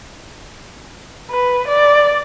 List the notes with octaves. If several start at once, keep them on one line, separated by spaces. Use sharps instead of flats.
B4
D5